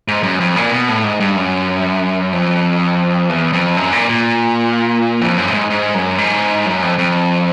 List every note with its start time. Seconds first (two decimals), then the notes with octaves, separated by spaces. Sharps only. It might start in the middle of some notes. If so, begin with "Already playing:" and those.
0.08 G#2
0.23 F#2
0.40 F2
0.56 A#2
0.72 B2
0.88 A2
1.04 G#2
1.20 G2
1.36 F#2
2.33 F2
3.29 E2
3.53 F2
3.77 F#2
3.93 A#2
4.10 A#2
5.21 F2
5.37 F#2
5.48 A2
5.54 G#2
5.70 G#2
5.95 F#2
6.18 G#2
6.66 F#2
6.83 F2
6.98 F2